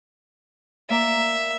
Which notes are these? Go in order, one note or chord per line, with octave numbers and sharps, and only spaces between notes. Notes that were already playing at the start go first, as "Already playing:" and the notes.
A#3 D5 E5 A#5